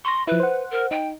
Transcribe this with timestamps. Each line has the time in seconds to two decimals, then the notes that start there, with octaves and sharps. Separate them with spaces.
0.05 C6 C#6 A#6
0.27 F3 E4 B4
0.40 C5 F#5
0.71 A#4
0.91 D#4 G5